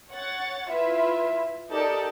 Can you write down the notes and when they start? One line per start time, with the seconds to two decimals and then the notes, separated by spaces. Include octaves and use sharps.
0.11 C#5 F#5 A6
0.70 E4 F4 B4 E5
1.71 D#4 G4 A4 A#4 D5 A5